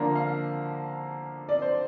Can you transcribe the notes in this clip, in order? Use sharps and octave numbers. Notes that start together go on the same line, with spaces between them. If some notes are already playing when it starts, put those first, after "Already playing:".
Already playing: D3 F3 A#3 D4 A#5
F5
D5
C5